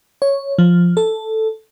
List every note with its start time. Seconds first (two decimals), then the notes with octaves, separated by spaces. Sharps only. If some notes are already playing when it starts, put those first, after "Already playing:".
0.22 C#5
0.58 F3
0.97 A4